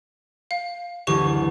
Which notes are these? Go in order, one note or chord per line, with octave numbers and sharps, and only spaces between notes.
F5
F#1 D2 E3 G4 C#6